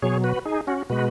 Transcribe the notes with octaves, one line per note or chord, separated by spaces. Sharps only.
B2 F#3 G#4 C#5
F#4 B4
D#4 G#4
C#4 F#4
B2 G#3 F#4 B4